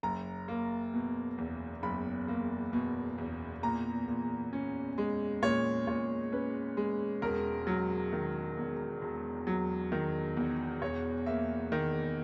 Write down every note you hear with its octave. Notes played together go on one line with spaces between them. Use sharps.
F#1 A#5
A#3
B2
E2
F#1 B5
A#3
B2
E2
A#2 A#5
A#2
C#4
G#3
A#2 C#5
A#2 C#5
C#4 B4
G#3
E1 A#4
F#3
D#3
E2
E1
F#3
D#3
E2
E1 C#5
A#3 E5
D#3